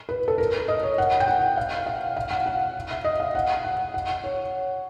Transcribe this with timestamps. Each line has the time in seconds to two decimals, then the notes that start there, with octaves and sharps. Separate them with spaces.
0.09 B4
0.28 A4
0.38 A#4
0.68 D#5
0.83 C#5
0.98 F#5
1.20 G5
1.28 F#5
1.57 F5
1.86 F5
2.17 F5
2.31 F#5
2.46 F#5
2.90 E5
3.05 D#5
3.20 F5
3.35 F#5
3.65 F#5
3.94 F#5
4.24 C#5